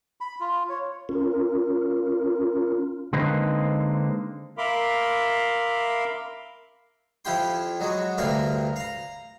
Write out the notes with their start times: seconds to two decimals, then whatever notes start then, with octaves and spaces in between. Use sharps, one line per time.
0.21 B5
0.40 F4
0.69 C#5
1.09 C#4 F4 A#4
3.13 D3 G#3 A#3 C4 D#4 B4
4.58 A#4 E5 F5 B5 C6 D6
7.25 F2 E4 F4 G4 G5 C6
7.80 F#3 G#3 F#4
8.18 D2 G2 C3 A#3 A#4 F5
8.76 F5 A#5